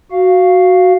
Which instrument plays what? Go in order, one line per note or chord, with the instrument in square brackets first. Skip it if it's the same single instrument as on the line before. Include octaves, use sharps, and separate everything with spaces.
[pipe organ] F#4 F5